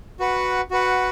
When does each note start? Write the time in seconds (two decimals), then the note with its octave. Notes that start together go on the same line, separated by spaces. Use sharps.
0.20 F#4 B4 F#5
0.71 F#4 B4 F#5